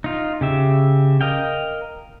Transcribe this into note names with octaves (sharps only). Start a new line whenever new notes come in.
D#4 F4
C#3 G4 E5
A#4 D#5 F5 G5